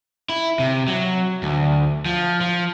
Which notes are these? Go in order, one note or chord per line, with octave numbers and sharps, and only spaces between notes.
E4
C3
F#3
D2
F3
F3